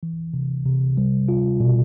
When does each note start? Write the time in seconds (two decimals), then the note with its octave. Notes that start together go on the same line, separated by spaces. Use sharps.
0.03 E3
0.34 C3
0.66 C3
0.97 G3
1.29 F4
1.61 B2